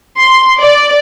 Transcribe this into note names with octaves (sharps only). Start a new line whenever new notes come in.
C6
D5